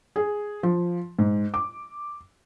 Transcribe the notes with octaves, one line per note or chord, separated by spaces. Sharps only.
G#4
F3
G#2
D6